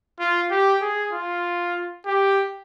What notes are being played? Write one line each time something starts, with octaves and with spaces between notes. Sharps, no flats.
F4
G4
G#4
F4
G4